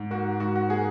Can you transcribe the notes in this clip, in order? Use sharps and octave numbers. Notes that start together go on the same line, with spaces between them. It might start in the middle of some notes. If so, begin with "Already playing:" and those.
Already playing: G#2
A#3 F#4
G#2 F#4
F#4
A#3 G#4